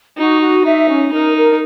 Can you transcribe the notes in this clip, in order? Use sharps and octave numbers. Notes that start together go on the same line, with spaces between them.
D#4 F#4
F#4
D#4 E5
C#4
D#4 A#4
A#4